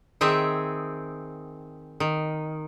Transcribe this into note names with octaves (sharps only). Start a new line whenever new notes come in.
D#3 C4 G#4 E5
D#3